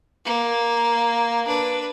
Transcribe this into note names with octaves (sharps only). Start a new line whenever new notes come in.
A#3
D4 B4